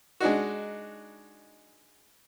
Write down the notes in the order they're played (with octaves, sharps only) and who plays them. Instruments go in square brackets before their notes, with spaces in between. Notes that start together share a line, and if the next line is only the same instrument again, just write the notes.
[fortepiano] G#3 D4 D#4 F#4